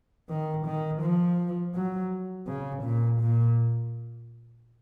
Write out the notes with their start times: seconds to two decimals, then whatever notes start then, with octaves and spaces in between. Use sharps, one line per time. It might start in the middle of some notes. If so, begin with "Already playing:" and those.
0.29 D#3
0.66 D#3
1.02 F3
1.75 F#3
2.47 C#3
2.83 A#2
3.20 A#2